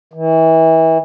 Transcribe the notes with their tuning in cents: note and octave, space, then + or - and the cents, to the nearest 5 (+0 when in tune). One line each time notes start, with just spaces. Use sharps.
E3 -30